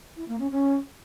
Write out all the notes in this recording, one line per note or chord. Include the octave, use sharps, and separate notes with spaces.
E4
A#3
C#4
C#4